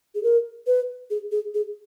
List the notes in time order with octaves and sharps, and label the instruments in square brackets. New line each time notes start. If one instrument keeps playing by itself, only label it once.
[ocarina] G#4
A#4
B4
G#4
G#4
G#4